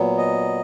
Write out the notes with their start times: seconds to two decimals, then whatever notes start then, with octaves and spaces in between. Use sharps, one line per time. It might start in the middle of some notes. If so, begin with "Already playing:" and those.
Already playing: A#2 F#3 B3
0.17 D#5